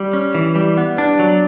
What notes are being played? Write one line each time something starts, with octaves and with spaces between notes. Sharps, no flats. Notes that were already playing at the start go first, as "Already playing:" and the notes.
Already playing: G3
C#4
E3
G3
B3
D4
F#3